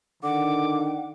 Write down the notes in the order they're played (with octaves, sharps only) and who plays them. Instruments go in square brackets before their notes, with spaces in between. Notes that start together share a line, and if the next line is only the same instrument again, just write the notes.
[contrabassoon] D3 [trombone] D#3 [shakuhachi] F#5 [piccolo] D6